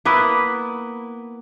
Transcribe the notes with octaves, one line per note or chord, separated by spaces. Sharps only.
A#3 B3 E4 B4